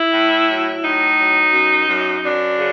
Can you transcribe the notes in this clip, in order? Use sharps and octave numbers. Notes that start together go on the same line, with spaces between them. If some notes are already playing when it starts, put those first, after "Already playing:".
Already playing: E4
A2
F#3
A2 D#4
F#3
F#2
F#2
F#2 D4
C#3